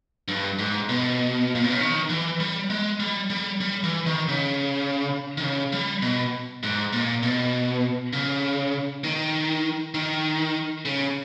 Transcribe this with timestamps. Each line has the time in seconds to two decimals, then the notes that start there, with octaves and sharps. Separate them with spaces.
0.28 G2
0.59 G#2
0.89 B2
1.55 A#2
1.64 B2
1.72 C#3
1.80 D#3
2.10 E3
2.40 G3
2.70 G#3
3.00 G3
3.30 G3
3.61 G3
3.84 E3
4.06 D#3
4.29 C#3
5.38 D#3
5.42 C#3
5.73 G3
6.02 B2
6.63 G#2
6.93 A#2
7.23 B2
8.13 C#3
9.04 D#3
9.94 D#3
10.85 C#3